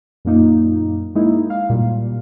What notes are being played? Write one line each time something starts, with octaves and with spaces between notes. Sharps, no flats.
F#2 A#2 A#3 D#4
G#3 A#3 D#4 E4
F5
A#2 G3